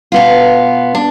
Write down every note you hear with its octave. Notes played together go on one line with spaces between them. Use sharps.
B2 B3 F4
D4